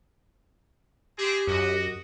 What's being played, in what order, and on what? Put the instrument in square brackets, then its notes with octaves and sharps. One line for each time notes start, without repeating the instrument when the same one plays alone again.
[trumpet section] C4 G#4 [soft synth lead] G4
[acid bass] F#2 [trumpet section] F#4 D#5